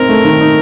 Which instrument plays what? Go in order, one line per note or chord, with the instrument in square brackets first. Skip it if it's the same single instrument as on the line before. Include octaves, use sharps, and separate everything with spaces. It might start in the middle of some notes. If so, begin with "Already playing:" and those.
Already playing: [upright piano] C4 D#4 [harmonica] A#4
[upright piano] A3
D#3
D#4